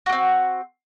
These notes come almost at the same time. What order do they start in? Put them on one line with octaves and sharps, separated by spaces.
F#4 A#3 C4